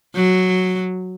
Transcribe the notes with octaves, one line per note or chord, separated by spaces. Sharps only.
F#3